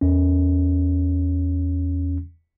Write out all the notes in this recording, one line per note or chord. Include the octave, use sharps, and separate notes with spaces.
E2 C#4